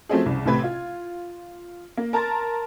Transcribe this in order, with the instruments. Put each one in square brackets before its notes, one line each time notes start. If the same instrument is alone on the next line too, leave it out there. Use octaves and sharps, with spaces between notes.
[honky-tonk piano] F3 F#3 A3 C4 C#4 G#4
C2 C#3
A1 A2 C3 B4 G#6
F4
A#3
A#4 A5 A#5 C6 A6